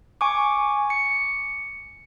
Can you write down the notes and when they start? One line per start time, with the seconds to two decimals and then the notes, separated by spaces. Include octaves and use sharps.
0.21 G#5 C#6 D6
0.90 C#7